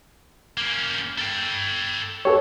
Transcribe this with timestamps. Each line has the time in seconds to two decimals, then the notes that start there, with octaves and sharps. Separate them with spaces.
0.57 A#3 C#4
1.19 A4 G5
2.25 G4 A4 B4 C#5